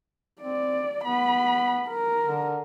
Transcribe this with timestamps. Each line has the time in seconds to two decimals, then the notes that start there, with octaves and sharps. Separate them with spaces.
0.42 C4 D5
1.05 B3 B5
1.89 A#4
2.25 D3